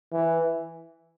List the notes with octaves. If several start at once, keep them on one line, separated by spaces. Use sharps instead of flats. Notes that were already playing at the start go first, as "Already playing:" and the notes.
E3